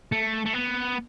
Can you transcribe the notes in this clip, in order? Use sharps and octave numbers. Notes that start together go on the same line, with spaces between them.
A3
A3
B3